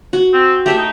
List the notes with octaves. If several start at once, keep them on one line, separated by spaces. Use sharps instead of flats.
F#4
C4
A3 G4 E5 G5
D#4